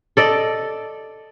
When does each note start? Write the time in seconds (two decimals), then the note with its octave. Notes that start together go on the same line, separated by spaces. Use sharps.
0.17 A4 D5 D#5